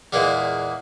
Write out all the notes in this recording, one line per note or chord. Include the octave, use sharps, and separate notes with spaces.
E2 A#2 G#3 A#3